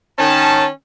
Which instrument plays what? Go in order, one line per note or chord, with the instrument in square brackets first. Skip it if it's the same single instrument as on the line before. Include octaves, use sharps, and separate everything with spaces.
[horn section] D#3 C#4 A5